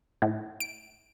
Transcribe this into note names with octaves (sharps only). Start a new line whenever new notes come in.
A2
D7